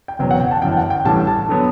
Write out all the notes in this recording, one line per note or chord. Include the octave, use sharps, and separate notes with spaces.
G5
F#1 E2 B2 F#3 G5
F#5
G5
A5
G1 F#2 E3 G5
F#5
G5
A1 A2 G3 D4 A5
A5
D3 F#3 B3